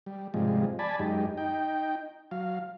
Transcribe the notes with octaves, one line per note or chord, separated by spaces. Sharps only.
G3
G#2 C3 F3 G3 G#3
D5 G#5 A5 B5
F#2 G#3 D#4 G4
D#4 G5
F#3 F5